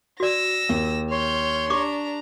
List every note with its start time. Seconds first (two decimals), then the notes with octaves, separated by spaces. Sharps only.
0.20 F#4 D5 E6 A#6
0.69 D#2
1.11 C#5 C6 F6 G6
1.70 D4 G4 A#5 C#6 D6